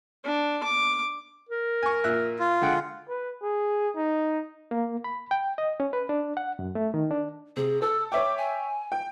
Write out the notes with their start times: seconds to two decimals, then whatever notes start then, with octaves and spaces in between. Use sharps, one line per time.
0.24 D4
0.63 D6
1.49 A#4
1.83 G#5 C#6
2.04 A#2 E5 F#6
2.39 F4
2.62 D3 G#3 F#5 G5
3.08 B4
3.42 G#4
3.96 D#4
4.71 A#3
5.04 B5
5.31 G5
5.58 D#5
5.80 C#4
5.93 B4
6.09 D4
6.37 F#5
6.59 F#2
6.75 A3
6.94 D#3
7.11 D4
7.57 C3 G#4
7.82 A4 E6
8.12 C#5 E5 G5 D6
8.38 G#5
8.92 G5